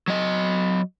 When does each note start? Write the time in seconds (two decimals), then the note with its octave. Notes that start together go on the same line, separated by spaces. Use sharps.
0.08 F#3 D#5